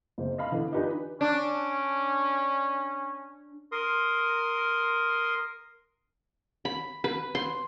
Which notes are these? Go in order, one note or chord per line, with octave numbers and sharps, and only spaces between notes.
F#1 C4
D#5 F5 B5
D3 E3 B3
D4 D#4 F4 G4 B4 G#5
C#4 D4
A#4 C6 D#6
B5
B4
C6